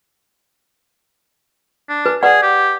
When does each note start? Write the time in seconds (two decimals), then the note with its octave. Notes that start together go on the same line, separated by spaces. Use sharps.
1.89 D4
2.06 B4
2.23 G#4 B4 D5 F#5
2.43 G4